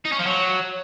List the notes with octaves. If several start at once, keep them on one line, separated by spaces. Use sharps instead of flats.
D#4
C#4
F3
F#3